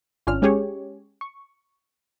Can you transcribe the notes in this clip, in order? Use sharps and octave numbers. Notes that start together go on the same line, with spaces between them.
G#1 C#4 D4 F4 F6
G#3 C#4 G4 G#4 C#5
C#6